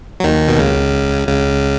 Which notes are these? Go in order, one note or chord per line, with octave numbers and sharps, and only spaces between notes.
F#3
D#2 D#3
B2
C#2 C#3
C#2 C#3